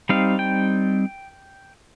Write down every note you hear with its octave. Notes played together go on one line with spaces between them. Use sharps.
G3 C4 D#4 F5
G5